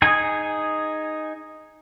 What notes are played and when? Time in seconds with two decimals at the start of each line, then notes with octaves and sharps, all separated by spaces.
0.02 D#4 G#4 G#5